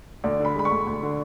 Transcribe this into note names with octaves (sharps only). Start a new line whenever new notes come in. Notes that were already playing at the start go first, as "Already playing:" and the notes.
D2 D5
D3
B5
G#3 B5
C#6
D2
D2
D3